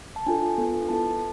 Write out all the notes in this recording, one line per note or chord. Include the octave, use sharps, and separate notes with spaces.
A5
D4 F4 A4 G#5
B3 F4 A4
B3 E4 A4 A5